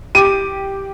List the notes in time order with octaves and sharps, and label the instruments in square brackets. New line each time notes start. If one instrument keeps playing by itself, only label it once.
[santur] G4 [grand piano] D6 D#7